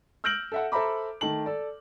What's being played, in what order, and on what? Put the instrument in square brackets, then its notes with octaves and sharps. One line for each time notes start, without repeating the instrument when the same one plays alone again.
[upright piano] E6 F6 G6 A#6 D7 F#7
A4 E5 F#5
A4 C5 E5 A#5 B5 D6
D#3 A3 A5 F#7
A4 D5